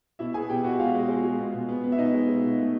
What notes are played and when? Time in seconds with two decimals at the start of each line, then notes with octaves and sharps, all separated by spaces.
0.19 B2 E4 E5
0.34 B3 G#4 G#5
0.49 B2 G4 G5
0.64 B2 F#4 F#5
0.79 G#3 F4 F5
0.95 G#3
1.09 G#3
1.25 G#3
1.39 B2
1.54 B2
1.69 B3
1.84 B3
1.92 E5
1.98 B2 D#4 D#5
2.14 G#3
2.29 G#3
2.43 B2
2.58 A3